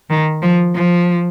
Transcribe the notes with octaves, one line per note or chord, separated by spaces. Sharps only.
D#3
F3
F3